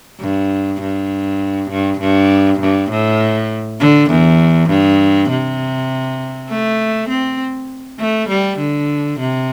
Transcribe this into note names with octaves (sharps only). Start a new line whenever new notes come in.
G2
G2
G2
G2
G2
A2
D3
E2
G2
C3
A3
C4
A3
G3
D3
C3